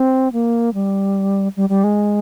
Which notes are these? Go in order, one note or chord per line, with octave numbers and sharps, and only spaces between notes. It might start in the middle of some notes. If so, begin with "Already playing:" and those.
Already playing: C4
A#3
G3
G3
G3
G#3